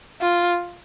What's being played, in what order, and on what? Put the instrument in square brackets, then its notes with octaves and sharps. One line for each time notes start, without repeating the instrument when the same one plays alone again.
[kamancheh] F4